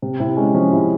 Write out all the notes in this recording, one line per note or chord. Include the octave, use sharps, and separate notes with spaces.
C3
C3 E4
G#3 C#4
F3 C#4
C3 E4